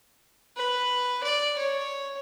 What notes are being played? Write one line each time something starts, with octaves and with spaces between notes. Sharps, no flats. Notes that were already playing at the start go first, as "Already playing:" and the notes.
B4
D5
C#5